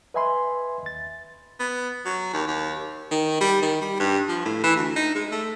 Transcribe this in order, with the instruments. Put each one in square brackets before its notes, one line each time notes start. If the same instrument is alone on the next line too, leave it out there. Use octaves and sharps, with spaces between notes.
[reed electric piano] B4 D#5 E5 G#5 B5 C6
D#2 A6
[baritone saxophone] B3
F#3
D#2
D#2
D#3
G3
D#3
G3
G2
F3
A2
E3
D2
D#4
G#3
A3